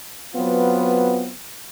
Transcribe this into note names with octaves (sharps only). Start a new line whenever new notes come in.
F#3 B3 C4 F4 B4